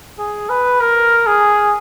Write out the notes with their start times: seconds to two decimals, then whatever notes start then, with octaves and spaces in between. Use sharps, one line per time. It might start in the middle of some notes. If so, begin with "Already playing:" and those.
0.19 G#4
0.49 B4
0.80 A#4
1.27 G#4